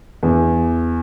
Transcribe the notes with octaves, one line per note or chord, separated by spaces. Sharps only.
E2